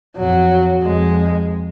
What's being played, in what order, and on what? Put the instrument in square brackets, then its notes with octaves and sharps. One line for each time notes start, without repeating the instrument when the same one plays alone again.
[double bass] F2 [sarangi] F#3
[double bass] F2 [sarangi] G#3